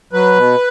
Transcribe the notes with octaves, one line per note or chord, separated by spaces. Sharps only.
F#3 B4
B2